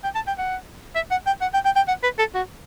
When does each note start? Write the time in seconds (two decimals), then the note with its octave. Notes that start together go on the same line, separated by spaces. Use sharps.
0.04 G5
0.15 A5
0.27 G5
0.38 F#5
0.95 E5
1.11 F#5
1.26 G5
1.41 F#5
1.54 G5
1.65 G5
1.76 G5
1.88 F#5
2.03 B4
2.19 A4
2.34 F#4